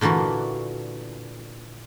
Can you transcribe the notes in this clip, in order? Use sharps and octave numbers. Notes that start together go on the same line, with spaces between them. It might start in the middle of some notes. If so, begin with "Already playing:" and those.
A#2 D3 E3 A#3 F#4